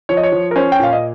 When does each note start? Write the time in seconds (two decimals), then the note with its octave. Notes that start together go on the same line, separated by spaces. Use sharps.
0.09 F3 C#5
0.17 D#5
0.23 C#5
0.32 F3
0.51 A#4
0.56 C#4 C5
0.72 G5
0.80 A#2 F5
0.93 D#5